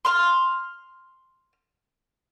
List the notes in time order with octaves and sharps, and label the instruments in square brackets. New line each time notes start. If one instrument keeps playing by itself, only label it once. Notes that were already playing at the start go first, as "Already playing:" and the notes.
[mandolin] C6 F6